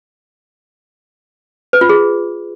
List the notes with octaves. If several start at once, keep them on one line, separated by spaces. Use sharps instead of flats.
B4
F4
G#4